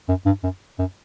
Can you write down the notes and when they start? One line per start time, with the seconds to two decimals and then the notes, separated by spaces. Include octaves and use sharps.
0.08 F#2
0.26 G2
0.43 F#2
0.79 F#2